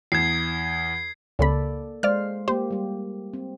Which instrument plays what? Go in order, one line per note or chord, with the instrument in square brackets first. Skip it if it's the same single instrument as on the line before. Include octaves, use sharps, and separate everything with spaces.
[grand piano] E2 [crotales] G#6 C7
[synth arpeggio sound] C#2 C#3 B5 [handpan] A#3 A4 D5
[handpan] G#3 C5 F5 [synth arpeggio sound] D5 F6
[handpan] A#3 G4 [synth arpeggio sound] C5
[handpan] G3 G4
C4